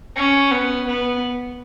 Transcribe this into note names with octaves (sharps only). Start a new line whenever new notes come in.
C#4
B3
B3